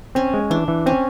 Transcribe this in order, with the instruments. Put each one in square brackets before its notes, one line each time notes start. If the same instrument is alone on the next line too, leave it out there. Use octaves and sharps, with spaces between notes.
[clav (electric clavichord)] C4 [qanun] C#4
[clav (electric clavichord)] G#3
[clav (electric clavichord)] E3 [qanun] D4
[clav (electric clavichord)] E3
[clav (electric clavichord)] C4 [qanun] C#4